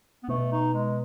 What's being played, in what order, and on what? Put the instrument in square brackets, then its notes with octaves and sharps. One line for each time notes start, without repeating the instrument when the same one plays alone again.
[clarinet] B3
[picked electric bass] B2 [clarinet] A3
[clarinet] D#4
G#3